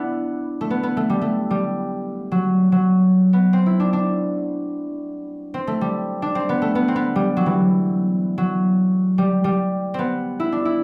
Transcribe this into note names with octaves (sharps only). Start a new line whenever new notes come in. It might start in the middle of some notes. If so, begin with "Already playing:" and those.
Already playing: B3 D4 E4
A3
B3
B3
A3
G3
A3
G3
F#3
F#3
B3
C4
E4
D4
D4
C4
A3
G3
D4
C4
B3
A3
B3
C4
B3
G3
F#3
E3
F#3
G3
G3
B3 C4
E4
D4
E4